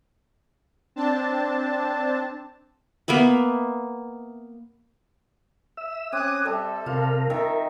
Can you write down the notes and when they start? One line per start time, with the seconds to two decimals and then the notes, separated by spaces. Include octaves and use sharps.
0.96 C4 D4 A5
3.08 A#3 B3 E5 B5
5.77 E5 E6
6.13 C4 C#4 D6 D#6 F#6 G#6
6.45 G3 A4 E5 A5
6.86 C3 F4 A#4 F5
7.30 D#3 A#4 E5